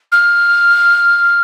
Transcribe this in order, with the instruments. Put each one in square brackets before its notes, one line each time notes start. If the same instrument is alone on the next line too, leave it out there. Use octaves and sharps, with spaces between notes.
[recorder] F6